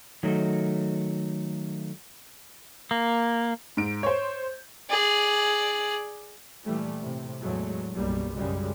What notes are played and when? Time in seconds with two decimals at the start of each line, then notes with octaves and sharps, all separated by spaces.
0.23 D#3 F#3 A3
2.91 A#3
3.77 G#2 D7
4.03 C5 C#5
4.90 G#4 D5
6.65 A#2 E3 G3 A3
7.00 A2 C3
7.42 E2 A2 F#3 G#3 A3
7.95 B1 F#2 B2 G3 A#3
8.36 F#2 C#3 G3 G#3